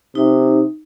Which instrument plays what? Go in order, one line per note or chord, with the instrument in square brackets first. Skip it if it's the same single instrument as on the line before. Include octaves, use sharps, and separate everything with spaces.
[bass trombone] C3 [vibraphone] D#4